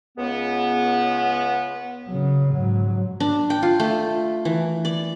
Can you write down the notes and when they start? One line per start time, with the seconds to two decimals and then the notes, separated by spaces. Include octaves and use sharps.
0.18 C#2 B3
2.07 C#3 F#3
2.52 G#2 F#3
3.20 D4
3.50 G5
3.62 F4
3.80 A3
4.45 E3
4.85 D5